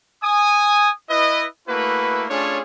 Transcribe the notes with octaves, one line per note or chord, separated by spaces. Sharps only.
G#5 D#6
E4 B4 D#5
A3 A#3 E4 F#4 B4
A3 C#4 D4 F4 G#4 C#5